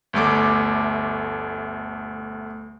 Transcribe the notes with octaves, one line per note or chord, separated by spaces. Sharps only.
G1 D2 A3 D6